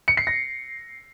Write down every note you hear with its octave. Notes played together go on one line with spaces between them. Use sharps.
C#7
C7
A#6